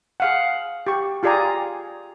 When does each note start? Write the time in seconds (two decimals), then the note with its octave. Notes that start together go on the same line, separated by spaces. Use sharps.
0.20 G#4 F5 F#5
0.87 G4 C#6
1.23 F4 G4 G#4 D5 G#5 A#5